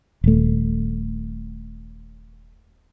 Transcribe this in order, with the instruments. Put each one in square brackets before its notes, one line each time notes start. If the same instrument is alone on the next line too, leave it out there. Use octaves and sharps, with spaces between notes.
[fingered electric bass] D#1 A3